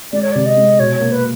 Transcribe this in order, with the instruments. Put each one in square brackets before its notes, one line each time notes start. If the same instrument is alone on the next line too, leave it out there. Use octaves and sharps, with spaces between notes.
[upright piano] G#3 [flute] D5
[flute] C#5
[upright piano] C3 [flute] D5
[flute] D#5
[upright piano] G#3
[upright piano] B2 [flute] C#5
[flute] C#5
[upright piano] A#3
[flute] B4